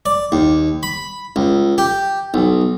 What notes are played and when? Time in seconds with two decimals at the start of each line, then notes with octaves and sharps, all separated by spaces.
0.06 D5
0.32 D#2
0.83 B5
1.36 C#2
1.78 G4
2.34 B1